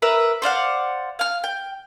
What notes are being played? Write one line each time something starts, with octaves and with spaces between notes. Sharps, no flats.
A#4 B4 E5
C5 D5 F5 F#5
F5 F6
G5